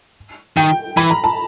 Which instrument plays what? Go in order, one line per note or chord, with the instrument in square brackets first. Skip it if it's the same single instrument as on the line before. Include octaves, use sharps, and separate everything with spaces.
[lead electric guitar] D#3 [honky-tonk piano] G5
[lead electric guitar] E3 [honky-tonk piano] B5
[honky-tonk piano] A#5
A5